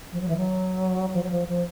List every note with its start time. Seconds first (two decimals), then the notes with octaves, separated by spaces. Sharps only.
0.13 F3
0.21 F#3
0.28 E3
0.37 F#3
1.14 F3
1.23 F#3
1.31 F3
1.48 F3